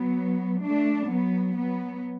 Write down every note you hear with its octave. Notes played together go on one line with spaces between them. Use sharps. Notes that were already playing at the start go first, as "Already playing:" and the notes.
Already playing: F#3 B3
A3 D4
F#3 B3
F#3 B3